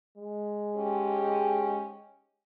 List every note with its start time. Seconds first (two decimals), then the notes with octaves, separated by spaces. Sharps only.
0.17 G#3
0.75 G#2 C#4 G4